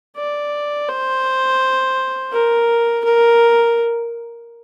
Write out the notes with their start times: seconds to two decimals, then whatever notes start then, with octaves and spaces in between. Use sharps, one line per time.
0.16 D5
0.88 C5
2.32 A#4
3.05 A#4